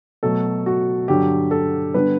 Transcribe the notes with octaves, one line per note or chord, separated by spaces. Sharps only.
B2 F#3 A3 A4
F#4
G2 D3 F#3 G4
A4
D3 G3 B3 B4